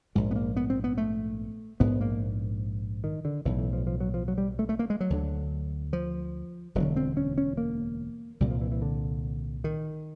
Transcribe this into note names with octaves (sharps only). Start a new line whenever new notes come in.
A#1 G#2 G#3
B3
A#3
B3
C4
B3
A3
A#1 G#2 B3
A#3
D#3
D3
B1 A2 E3
E3
F3
F3
F#3
F3
F#3
G3
A3
A3
A#3
G#3
F#3
D2 D3
F3
E1 D2 D3 F#3
C4
C#4
C#4
A#3
C2 A#2 G3
F3
E3
E3
D3
D#3